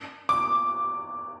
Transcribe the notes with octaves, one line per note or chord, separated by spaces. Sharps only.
D6